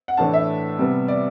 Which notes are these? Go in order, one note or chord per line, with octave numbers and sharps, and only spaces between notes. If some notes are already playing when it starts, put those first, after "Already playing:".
F#5
A2 E3 A3 D4 A5
E5
C3 G3 B3
D5